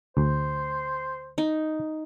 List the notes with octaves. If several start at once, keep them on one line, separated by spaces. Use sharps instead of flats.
D2 C5
D#4